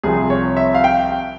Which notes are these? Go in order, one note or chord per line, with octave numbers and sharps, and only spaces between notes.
C2 C3 F3 C4 G#4
C#5
E5
F5
G5